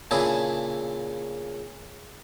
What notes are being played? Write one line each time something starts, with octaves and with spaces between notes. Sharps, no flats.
A#2 C#3 D4 E4 G#4